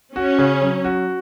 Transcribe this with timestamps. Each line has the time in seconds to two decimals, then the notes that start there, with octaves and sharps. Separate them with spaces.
0.16 C#4 F#4
0.38 C#3
0.62 F#3
0.84 F#4